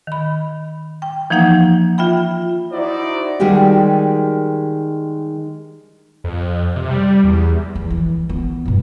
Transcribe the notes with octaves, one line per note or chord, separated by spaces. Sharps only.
D#3 B5
G5
E3 F3 A#3 D#4 F#5 G6
F4 E5 G5 B5
D#4 E4 F#4 C5 D5
D#3 G3 G#3 F#4 G4
F2
C3
G3
E2
E2
E3
B3
G2 B2